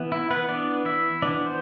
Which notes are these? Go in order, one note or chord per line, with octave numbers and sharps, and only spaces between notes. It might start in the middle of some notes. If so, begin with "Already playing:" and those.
Already playing: E3 B3
E4
B3 B4
E3 B3 D4 D5
E4 E5
E3 B3 D4 D5
C5